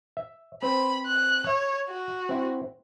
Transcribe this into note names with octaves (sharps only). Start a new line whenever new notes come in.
E5
C4 B4 C5 B5
F#6
C#5 E5
F#4
C4 E4